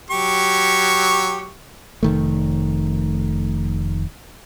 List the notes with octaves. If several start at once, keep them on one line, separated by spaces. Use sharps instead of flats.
F#3 G4 C#6
F1 D#3 A3